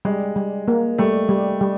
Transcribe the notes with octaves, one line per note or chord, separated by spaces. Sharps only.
G3 G#3
G3
A#3
G3 A3
G3
G3